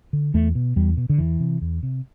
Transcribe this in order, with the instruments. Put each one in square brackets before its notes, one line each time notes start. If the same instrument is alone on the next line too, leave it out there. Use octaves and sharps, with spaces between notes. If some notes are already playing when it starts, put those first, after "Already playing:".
[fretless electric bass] D3
E2 A3
B2
E2 G3
B2
D3
E2 E3
C3
E2
C3